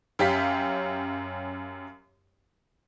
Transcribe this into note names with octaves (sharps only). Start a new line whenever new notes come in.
F#2 C#4 G4 F5 B6